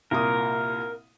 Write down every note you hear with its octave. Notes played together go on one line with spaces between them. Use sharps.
C2 A#2 A#4 D#6